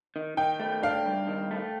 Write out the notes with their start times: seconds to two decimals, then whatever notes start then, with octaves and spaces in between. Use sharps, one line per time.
0.16 D#3
0.37 D#3 G5
0.60 A3
0.83 D4 F5
1.06 G2
1.27 D#3
1.51 A3